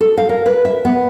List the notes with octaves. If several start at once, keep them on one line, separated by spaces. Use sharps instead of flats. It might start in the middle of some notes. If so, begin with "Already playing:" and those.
A4
F5
A#4
B4
E5
B3